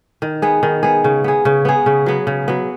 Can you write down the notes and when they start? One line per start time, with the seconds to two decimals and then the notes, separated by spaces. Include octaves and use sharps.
0.22 D#3
0.42 B3 G#4
0.63 D#3
0.83 B3 G#4
1.04 C#3
1.24 B3 G#4
1.45 C#3
1.65 B3 G#4
1.86 C#3
2.06 F#3 B3
2.27 C#3
2.48 F#3 B3